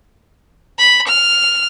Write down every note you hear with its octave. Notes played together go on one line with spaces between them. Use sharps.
B5
F6